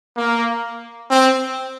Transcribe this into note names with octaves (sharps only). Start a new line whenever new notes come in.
A#3
C4